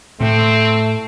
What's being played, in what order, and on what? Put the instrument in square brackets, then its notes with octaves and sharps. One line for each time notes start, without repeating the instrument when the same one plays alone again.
[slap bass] A2 [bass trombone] A3 [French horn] C4